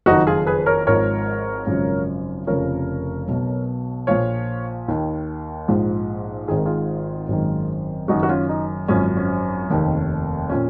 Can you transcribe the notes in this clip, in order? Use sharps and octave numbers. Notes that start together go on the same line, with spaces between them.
F#1 F2 D#3 D#4 F#4
F4 G#4
G#4 B4
A#4 C#5
G#1 G#2 F3 A#4 C#5
G#1 F#2 C#3 F3
F1 F2 C#3 F3 A#4 C#5
B1 B2
A#1 A#2 F3 C#5 F5
D#2 D#3
A#1 G#2 F3
G#1 G#2 D#3 G#4
A#4
F4 G#4
G#1 F#2 D#3
F#1 F#2 D#3 D#4 F#4
F#4
C#4 F4
D#4
G#1 F#2 F3 C#4
C#4
F1 D#2 D#3
A#2 F3 C#4